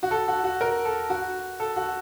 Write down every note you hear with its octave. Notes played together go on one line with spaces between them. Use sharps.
F#4
A4
F#4
F#4
A#4
A4
F#4
A4
F#4